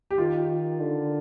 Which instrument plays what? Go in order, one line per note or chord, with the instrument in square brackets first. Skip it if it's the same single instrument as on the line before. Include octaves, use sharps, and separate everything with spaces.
[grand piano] G4
[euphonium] D#3 [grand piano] F4
[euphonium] D3